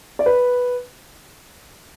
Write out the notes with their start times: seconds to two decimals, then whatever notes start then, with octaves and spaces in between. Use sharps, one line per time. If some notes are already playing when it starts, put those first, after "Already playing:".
0.19 D5
0.26 B4